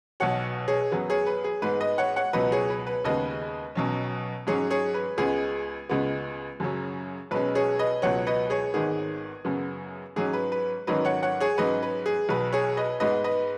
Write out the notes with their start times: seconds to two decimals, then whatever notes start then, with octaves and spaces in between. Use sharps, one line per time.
0.20 B1 B2 B3 C#5 F#5
0.68 G#4 C#5
0.92 F#2 F#3 B3
1.10 G#4 C#5
1.27 B4
1.44 G#4
1.62 G#2 G#3 B3 B4
1.80 B4 D#5
1.98 C#5 F#5
2.16 C#5 F#5
2.33 C#2 B2 F#3 B3 B4 D#5
2.52 G#4 C#5
2.70 B4
2.87 B4
3.04 D#2 C#3 G#3 B3 B4 D#5
3.75 B1 B2 F#3 C#4
4.47 G#2 F#3 C#4 G#4 C#5
4.71 G#4 C#5
4.94 B4
5.18 C#2 C#3 G#3 B3 G#4
5.89 C#2 C#3 G#3 B3
6.60 F#2 C#3 F#3 C#4
7.31 B1 B2 G#3 C#4 B4
7.55 G#4 C#5
7.79 B4 D#5
8.02 C#2 B2 F#3 B3 C#5 F#5
8.27 B4 D#5
8.50 G#4 C#5
8.74 G#1 G#2 D#3 B3 G#4
9.45 F#2 C#3 B3
10.16 G#2 F#3 C#4 G#4
10.33 B4
10.52 B4
10.87 G#1 G#2 D#3 F#3 C#4 B4 D#5
11.05 C#5 F#5
11.23 C#5 F#5
11.40 G#4 C#5
11.58 G#2 F#3 C#4 B4 D#5
11.83 B4
12.06 G#4
12.29 B1 B2 B3 B4
12.53 G#4 C#5
12.77 B4 D#5
13.00 G#2 G#3 B3 B4 D#5
13.24 B4 D#5